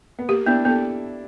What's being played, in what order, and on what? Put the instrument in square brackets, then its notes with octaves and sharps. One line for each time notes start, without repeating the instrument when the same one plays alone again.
[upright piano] B3
[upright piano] A#3 [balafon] G4
[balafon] B3 [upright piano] D4 E4
[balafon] B3 [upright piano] G4 A4